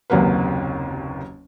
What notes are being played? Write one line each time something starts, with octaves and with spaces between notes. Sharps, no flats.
F#1 D#2 C3 F#3 A#3 B4